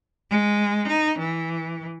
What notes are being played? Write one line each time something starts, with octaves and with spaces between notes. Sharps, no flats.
G#3
D#4
E3